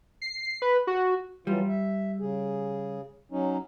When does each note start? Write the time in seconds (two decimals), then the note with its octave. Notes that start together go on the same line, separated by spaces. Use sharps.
0.22 C7
0.62 B4
0.87 F#4
1.47 E3 F#3 G3 F4
1.68 E5
2.20 C#3 G#4
3.32 F#3 C#4 D#4